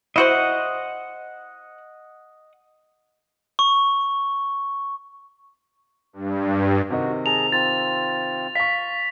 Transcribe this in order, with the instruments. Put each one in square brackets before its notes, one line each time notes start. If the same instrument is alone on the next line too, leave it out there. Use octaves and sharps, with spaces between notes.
[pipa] E4 F#4 C5 [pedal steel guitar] D#5 F#5
[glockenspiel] C#6
[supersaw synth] G2
[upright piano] C3 D#3 D#5 [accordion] F#4
[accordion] G#4 A5 A#5 [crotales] F7
[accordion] C4 F4 [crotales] A6
[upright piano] F5 C#6 [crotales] B6